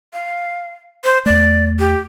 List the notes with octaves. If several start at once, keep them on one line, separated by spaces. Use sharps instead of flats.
F5
C5
E2 A3 D5
G4